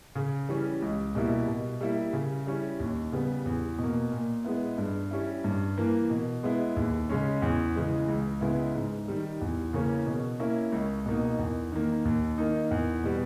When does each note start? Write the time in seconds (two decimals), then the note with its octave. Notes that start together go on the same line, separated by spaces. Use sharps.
0.15 C#3
0.49 E3 G3 C#4
0.82 C#2
1.15 B2 G3 A#3 E4
1.48 B2
1.81 G3 A#3 E4
2.13 C#3
2.47 G3 C#4 E4
2.80 D#2
3.12 C#3 G3 B3
3.46 E2
3.79 B2 A#3
4.12 A#2
4.45 G#3 B3 E4
4.78 G2
5.11 G3 C#4 E4
5.44 G2
5.77 E3 A#3
6.10 B2
6.43 G#3 B3 E4
6.77 D#2
7.09 C#3 G#3 C#4
7.42 E2
7.76 C#3 E3 G#3
8.08 C#2
8.41 C#3 G#3 B3 E4
8.75 G#2
9.08 D#3 G3
9.41 E2
9.73 C#3 E3 A#3 C#4
10.06 B2
10.40 A#3 C#4 E4
10.72 C#2
11.06 B2 A#3 D#4
11.39 E2
11.72 D#3 A#3
12.05 D#2
12.38 D#3 A#3 D#4
12.71 E2
13.04 B2 G3 B3